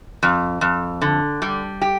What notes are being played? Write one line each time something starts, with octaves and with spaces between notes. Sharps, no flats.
F2
F2
D3
G3
G4